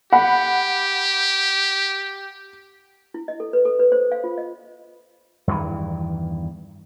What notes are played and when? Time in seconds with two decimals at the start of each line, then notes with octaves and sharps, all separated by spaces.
0.12 G4 F#5 B5
3.14 E4
3.28 D#5
3.40 A4
3.53 B4
3.65 A4
3.79 B4
3.92 C5
4.12 F5
4.24 F4
4.38 D#5
5.47 E2 G2 D#3 E3